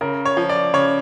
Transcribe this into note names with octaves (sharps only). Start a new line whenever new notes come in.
C#3 A#4
C#5
F3
D5
C#3 C#5